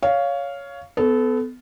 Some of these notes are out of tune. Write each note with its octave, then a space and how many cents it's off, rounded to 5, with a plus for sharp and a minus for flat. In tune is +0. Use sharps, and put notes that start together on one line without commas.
C#5 +15 F5 +0
B3 +25 A4 -20